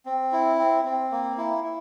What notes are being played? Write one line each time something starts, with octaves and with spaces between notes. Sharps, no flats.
C4
E4
C4
C4
A#3
E4
E4